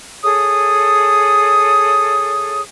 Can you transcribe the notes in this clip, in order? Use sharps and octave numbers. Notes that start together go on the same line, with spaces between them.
G#4 A4 C#5 D#6